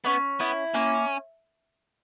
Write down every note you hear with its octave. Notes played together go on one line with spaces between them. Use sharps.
B3 C#4
B3 E4
A#3 C#4